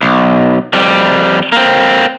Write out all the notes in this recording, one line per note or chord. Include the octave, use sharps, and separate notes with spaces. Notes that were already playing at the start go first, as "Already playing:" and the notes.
B1
F2 G3
A#3 C4